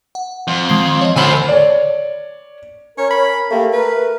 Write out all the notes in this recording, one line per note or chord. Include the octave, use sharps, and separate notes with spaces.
F#5
F2
D#3 G#3 C7
C#5 D#5
D2 C5 F#5 G#5 B5 E6 F6
C#5 D5
C#4 A#4 C#5
B5
A3 A#3 G4
A#4 B4